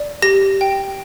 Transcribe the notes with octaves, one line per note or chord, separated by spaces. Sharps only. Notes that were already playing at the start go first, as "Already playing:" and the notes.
Already playing: D5
G4 A#6
G5